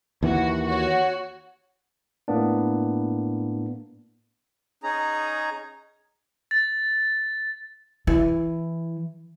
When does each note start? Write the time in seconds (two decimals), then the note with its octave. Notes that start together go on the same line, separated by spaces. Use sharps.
0.23 D#2 E3 F#4
0.67 F#4 C#5
2.28 A2 A#3 B3 D4
4.83 C#4 D#4 G#4 A#5
6.51 A6
8.07 E3